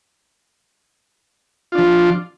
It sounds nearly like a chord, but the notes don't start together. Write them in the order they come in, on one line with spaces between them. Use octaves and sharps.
F4 D4 F3